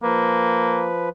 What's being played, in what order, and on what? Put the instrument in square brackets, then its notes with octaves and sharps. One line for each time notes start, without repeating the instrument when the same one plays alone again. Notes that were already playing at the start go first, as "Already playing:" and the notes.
[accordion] F3 B4 [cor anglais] A#3